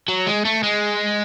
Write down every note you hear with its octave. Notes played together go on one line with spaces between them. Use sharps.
F#3
G#3
A3
G#3